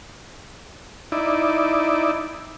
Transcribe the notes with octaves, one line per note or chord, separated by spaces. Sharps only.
D#4 E4 D5